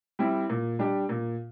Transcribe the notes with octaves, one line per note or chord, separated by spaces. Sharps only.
G3 C4 E4
A#2
G3 D4 G4
A#2